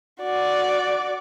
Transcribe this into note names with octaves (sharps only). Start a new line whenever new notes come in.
F#4 D5